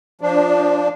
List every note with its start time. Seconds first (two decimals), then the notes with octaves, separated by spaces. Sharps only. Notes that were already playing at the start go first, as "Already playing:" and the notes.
0.21 F3 D4